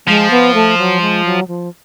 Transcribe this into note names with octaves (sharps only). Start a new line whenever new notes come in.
F3 G#3
B3
A3
F#3
G#3
F#3
F3